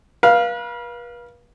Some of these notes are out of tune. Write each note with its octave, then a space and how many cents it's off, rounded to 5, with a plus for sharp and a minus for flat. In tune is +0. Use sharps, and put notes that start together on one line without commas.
B4 -40 F5 +0